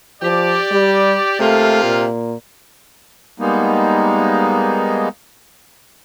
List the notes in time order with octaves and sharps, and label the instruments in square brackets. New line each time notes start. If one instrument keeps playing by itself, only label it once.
[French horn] F3 [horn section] G4 D5
[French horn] G3
[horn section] C3 A#3 F4 [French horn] A3
[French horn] A#2
[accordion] G3 G#3 A#3 B3 D#4